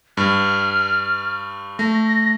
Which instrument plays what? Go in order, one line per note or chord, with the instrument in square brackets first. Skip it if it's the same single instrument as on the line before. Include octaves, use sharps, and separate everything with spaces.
[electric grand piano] G2 [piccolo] F6
[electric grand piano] A3 [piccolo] A#6